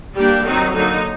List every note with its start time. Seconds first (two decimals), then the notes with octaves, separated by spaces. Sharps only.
0.16 G3 A#3 D4 G4
0.44 D#3 F#3 C4 D#4
0.74 D3 F#3 A#3 D#4